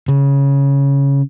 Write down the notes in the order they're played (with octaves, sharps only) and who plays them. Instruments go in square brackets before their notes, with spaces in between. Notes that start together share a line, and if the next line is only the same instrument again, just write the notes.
[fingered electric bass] C#3